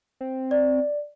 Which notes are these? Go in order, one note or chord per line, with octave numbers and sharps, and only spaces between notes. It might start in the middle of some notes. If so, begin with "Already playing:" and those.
C4
D5